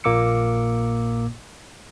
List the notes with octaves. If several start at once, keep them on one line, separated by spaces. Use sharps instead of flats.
A#1 A#2 A#3 D6 E6 C#7